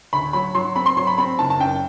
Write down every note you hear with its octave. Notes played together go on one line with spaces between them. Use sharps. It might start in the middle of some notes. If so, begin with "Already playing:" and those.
D2 B5
F#3 B5
F#3 C6
C4 B5
C6
F#3 C6
B5
C4 B5
F#1 A5
A5
F#2 G5